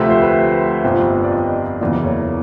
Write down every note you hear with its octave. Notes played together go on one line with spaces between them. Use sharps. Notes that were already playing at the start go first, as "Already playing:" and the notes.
Already playing: D2 C3 F3 A3 E5
C5
B4
G1 F2 C3 F3
D5
D#5
F#1 E2 C#3 F#3 A#3 D5
C#5